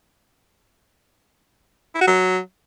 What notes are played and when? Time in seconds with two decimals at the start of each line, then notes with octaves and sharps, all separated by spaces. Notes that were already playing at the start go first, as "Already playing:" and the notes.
1.95 E4
2.01 F#4
2.07 F#3